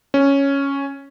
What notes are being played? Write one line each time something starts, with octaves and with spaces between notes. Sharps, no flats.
C#4